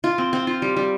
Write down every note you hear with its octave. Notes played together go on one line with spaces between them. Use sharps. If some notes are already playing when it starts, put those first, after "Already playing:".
F4
C4
C4
F4
G3
G3